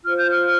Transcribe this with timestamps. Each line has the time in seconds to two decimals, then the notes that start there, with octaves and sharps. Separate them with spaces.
0.04 F4 C5 F6
0.17 G6
0.29 F6